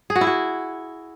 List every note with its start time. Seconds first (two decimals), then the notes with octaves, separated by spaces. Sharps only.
0.10 G#4
0.16 F#4
0.21 E4
0.27 F#4